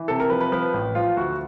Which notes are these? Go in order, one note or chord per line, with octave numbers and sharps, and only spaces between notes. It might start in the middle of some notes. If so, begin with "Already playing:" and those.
Already playing: E3
C3 A4
A#4
F3 B4
B4
F3 B4
A1
F3 F4
D2 F#4